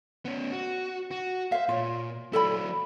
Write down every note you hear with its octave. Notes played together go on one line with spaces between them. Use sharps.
B3 C#4
F#4
F#4
C5 E5 F5
A#2 F4 C#5
F#3 E4 A4 D5 B5